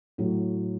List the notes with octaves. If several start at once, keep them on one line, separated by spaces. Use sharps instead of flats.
A2 F#3